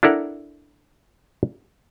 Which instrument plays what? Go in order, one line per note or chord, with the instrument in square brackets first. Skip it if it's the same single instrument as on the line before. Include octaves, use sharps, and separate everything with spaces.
[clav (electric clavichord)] D4 E4 A4 A#4 F#5